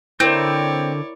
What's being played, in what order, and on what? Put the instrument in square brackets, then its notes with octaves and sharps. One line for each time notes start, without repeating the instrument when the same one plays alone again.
[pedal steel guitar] D3 G6 [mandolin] C4 [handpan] E4 A#4 [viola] C#5 D5